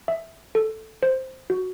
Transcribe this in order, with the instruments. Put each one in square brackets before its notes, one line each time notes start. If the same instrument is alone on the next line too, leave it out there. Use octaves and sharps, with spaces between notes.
[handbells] E5
A4
C5
F#4